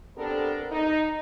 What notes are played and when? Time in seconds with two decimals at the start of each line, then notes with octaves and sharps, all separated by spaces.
0.17 B3 C4 D4 G4 A4 A#4
0.71 D#4